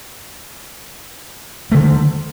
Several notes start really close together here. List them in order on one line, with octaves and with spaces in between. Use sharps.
A3 D3 D#3